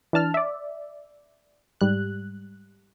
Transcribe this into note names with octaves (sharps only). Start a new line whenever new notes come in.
E3 D4 A5 F6
D5 E5
G#2 G3 F#6